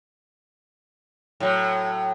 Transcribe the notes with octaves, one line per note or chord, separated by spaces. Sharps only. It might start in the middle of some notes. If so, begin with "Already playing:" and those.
A2 F#3